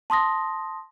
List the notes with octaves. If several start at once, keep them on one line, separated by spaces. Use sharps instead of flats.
A5 C6 D#6 A#6